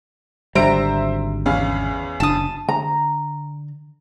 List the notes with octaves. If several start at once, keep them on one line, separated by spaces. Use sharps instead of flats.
G#1 D3 G3 C5 E5 A#5 D7
E2 C#4 F5
F#1 D4 A5 D#6
D3 A#5